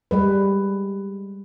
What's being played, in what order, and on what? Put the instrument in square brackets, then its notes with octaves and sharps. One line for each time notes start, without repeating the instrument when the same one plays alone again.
[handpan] G3 G#3 B4